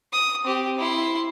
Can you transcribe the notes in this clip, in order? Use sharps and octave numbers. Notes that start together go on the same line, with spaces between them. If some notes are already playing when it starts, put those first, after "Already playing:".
D#6
C4 G4
E4 C6